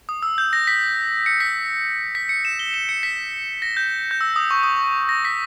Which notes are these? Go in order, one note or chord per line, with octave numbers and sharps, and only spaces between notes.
D#6
E6
G6
A#6
B6
C#7
B6
B6
C#7
E7
G7
E7
C#7
B6
A#6
G6
G6
E6
D#6
C#6
D#6
C#6
A#6
B6